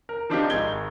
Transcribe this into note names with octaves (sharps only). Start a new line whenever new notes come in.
A#4
F3 C4 D4 D#4 F4 G4
G#1 D#3 G#3 G#6 G7